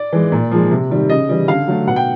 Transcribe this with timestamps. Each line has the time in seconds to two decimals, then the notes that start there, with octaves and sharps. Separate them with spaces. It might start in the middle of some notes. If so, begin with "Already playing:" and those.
Already playing: D5
0.13 E3 G#3
0.32 A#2
0.51 F3 G#3
0.71 C3
0.90 D#3 G3
1.10 C#3 D#5
1.29 E3 G3
1.48 D3 F5
1.68 F#3 A3
1.87 B2 F#5
1.96 G5